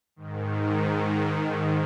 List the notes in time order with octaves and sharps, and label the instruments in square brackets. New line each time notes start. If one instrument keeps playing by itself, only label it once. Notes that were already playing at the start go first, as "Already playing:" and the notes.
[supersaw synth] G#2 D#3